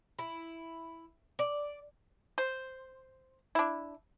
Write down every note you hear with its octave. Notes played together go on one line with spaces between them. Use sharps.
E4
D5
C5
D4 E4